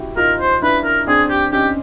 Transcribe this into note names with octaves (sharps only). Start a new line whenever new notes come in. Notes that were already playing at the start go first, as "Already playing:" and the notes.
Already playing: E4 F#4 G4
D#4 F4 A#4
C5
D4 E4 B4
A#4
C4 D4 G#4
G4
C#4 D#4 G4